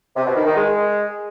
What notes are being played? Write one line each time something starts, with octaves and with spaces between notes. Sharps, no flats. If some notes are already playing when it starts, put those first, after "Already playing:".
C3
B2
D#3
D#3
G#3